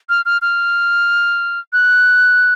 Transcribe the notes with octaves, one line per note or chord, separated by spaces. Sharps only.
F6
F6
F6
F#6